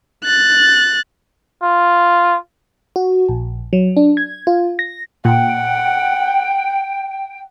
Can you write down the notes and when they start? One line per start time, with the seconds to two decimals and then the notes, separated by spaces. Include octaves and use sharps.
0.24 F#6 A6
1.63 F4
2.96 F#4
3.29 A#1
3.73 F#3
3.97 D4
4.17 G#6
4.47 F4
4.79 A#6
5.25 A#2 F#5 G5